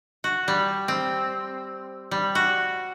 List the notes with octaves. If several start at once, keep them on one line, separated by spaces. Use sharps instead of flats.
F#4
G3
C4
G3
F#4